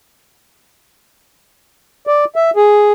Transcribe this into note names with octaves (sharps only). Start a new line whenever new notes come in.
D5
E5
G#4